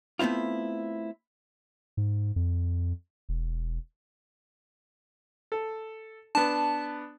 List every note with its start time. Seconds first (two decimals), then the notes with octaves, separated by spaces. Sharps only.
0.19 A3 B3 C4 E4 F4
1.97 G#2
2.36 F2
3.29 E1
5.52 A4
6.35 B3 D4 A5